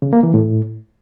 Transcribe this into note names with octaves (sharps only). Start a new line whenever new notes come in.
C#3
A#3
E3
A2